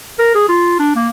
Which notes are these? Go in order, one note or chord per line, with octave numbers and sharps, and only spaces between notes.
A#4
G#4
F4
D4
A#3